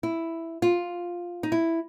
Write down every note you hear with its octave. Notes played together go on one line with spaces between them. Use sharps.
E4
F4
D#4
E4